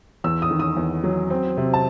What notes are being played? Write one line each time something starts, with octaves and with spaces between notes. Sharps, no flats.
E2 E6
D#6
D#3
D#6
E2
F#3
C4
C3
A5